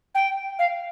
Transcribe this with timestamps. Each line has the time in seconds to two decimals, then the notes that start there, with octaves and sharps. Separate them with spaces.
0.15 G5
0.59 F5